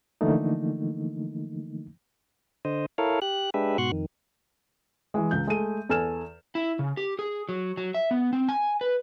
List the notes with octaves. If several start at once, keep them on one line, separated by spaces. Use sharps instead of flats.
D3 E3 F3 A3 A#3 D#4
D3 C5 D#5
E4 A4 A#4 C#5 F5
G4 F#6
G#3 D4 G4 B4 E5
G#2 B2 F#4 C6 C#6 F#6
F2 D#3
E3 G#3
C#2 G6
G#3 A3 D#7
E2 A4 G#5 F6 E7
E4
C#3
G4
G#4
F#3
F#3
E5
B3
C4
G#5
B4